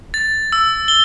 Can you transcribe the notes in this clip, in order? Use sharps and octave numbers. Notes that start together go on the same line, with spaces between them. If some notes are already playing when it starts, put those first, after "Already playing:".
A6
E6
G7